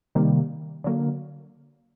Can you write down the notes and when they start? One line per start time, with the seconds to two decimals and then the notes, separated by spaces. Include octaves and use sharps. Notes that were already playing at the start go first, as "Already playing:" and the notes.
0.15 C3 D#3 G3 A#3
0.84 D3 F#3 A#3